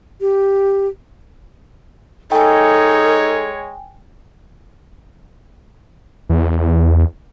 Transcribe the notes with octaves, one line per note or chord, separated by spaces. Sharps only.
G4
G#3 D#4 A4 C#5 G5 G#5
E2